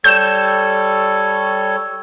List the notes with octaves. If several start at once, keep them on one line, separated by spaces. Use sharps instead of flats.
G3 A4 C#5 G6 E7